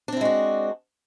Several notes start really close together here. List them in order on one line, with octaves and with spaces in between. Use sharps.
D4 C4 E4 G#3 F#4